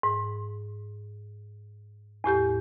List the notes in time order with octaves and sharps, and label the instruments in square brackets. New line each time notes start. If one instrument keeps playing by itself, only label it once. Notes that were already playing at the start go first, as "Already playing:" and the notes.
[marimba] G#2
E2 A2 G4 G6